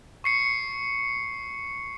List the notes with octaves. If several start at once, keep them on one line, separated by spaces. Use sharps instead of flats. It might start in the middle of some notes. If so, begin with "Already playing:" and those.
C#6 C7 C#7